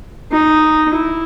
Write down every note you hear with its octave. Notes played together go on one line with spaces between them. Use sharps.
D#4
E4